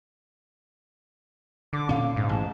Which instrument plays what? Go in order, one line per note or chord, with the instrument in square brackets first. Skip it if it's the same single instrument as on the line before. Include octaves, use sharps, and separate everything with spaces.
[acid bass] D3 [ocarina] D6
[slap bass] D2 A#2 C#4 [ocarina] F5
[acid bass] G#2
[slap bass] A1 [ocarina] A5